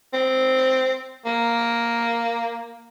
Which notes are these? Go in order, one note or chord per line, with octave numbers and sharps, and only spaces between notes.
C4
A#3